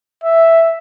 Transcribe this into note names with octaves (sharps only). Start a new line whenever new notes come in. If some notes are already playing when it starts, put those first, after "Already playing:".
E5